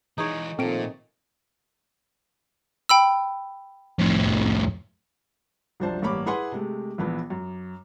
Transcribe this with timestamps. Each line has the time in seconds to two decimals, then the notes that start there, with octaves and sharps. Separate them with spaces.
0.18 E3 G#3 D#4 G#4 C#5
0.59 A#2 D#3 F3 A3 C4 D7
2.89 G5 B5 E6
3.99 F2 A2
5.80 C2 F#2 F3 D4 C5 A5
6.02 A1 G2 A#3 C#5 B5 D6
6.26 E4 G#4 B4 F#5 G#5 C6
6.52 C3 G#3 A3
6.98 A#1 E3 B3
7.30 F#2